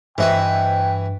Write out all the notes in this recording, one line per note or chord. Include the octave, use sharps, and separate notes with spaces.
G2 E3 F#4 B4 C5 D#5 E5 G5